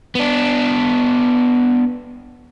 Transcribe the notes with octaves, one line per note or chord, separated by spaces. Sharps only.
B3 D4